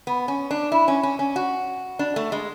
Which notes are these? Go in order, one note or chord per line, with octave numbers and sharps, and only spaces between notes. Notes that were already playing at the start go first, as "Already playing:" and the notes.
B3
C#4
D4
E4
C#4
C#4
C#4
F#4
D4
A3
G#3